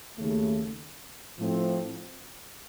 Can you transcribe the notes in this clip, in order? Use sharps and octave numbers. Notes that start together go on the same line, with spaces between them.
D#2 C#3 A3
A2 F3 A3 C4